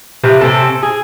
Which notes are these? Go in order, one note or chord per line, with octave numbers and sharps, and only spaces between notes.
C3 E3 F3 C4
C3 C4 C#4 A4
G#4